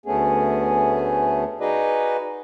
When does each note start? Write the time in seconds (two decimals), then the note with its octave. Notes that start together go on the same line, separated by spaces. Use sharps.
0.06 D2 A3 B3 C#4 G#4
1.60 D#4 F#4 G#4 B4 D5 D#5